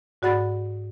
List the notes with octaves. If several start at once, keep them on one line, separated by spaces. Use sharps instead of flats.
G#2 F#4 D5 F#5 B5 A6